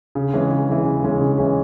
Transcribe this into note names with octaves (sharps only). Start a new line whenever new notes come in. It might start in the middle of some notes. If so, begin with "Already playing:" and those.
C#3
E3 G#3 C#4
C#3
E3 G#3 C#4
C#3
E3 G#3 C#4
C#3
E3 G#3 C#4